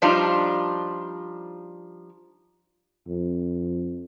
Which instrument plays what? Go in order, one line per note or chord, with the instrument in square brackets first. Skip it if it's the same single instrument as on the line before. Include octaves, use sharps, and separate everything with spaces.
[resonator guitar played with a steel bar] F3 G3 D4 D#4 F4
[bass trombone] F2